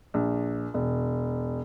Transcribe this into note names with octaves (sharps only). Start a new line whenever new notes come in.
A#1
E1